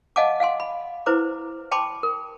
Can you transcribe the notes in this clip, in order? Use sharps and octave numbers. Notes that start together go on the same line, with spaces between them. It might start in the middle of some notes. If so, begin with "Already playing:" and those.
D#5 F5 F#5 G#5 A5 D6
F5 F#5 G#5 C6
B5
E4 B4 C5 A#5 D6
G5 A5 B5 C6 D6
A#4